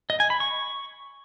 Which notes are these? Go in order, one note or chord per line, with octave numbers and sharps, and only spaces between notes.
D#5
G#5
B5
C#6